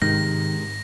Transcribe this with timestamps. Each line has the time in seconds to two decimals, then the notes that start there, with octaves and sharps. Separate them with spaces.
0.02 G#2 C3 D#3 G#3 A#6